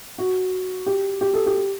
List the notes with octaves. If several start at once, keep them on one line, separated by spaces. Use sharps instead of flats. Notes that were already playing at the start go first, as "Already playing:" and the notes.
F#4
G4
G4
A4
G4